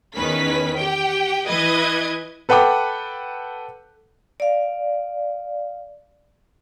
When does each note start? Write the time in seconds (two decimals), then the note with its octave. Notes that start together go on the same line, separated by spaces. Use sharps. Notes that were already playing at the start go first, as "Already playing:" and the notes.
0.15 E2 D#3 C#4 B4 B6
0.78 G4 G5
1.47 E3 B4 D#5 G#6
2.49 A4 B4 F#5 G5 B5 D6
4.40 D5 F5